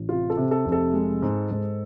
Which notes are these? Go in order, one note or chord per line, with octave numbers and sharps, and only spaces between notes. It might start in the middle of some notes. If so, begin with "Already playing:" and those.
Already playing: A1
C3 F4
A4
C3
A4
F1
A4
G#3
G#2
G#2